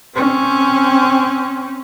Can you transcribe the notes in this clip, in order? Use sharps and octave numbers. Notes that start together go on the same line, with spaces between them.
C4 C#4